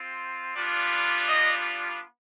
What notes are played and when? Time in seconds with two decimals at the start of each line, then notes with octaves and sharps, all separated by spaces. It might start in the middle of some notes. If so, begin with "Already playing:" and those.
Already playing: C4 F4
0.54 G3 B3 D4 F4
1.27 D#5